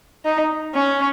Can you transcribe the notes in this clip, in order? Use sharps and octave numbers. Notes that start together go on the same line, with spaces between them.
D#4
C#4